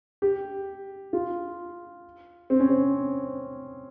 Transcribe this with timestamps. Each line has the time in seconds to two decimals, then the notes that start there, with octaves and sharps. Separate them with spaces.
0.22 G4
1.13 F4
2.50 C4
2.60 C#4
2.69 C4